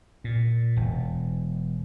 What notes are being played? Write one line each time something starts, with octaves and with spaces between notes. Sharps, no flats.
A#2
E1